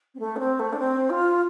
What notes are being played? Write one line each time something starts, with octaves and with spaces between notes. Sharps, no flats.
C4
A3
D4
C4
A3
D4
C4
F4